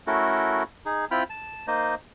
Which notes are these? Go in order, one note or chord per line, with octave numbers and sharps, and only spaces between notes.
A3 C#4 E4 F#4 A4 A#4
D#4 G#4
C4 E4 F4 G5 B5 F6
A5
A#3 D#4 C5 D#5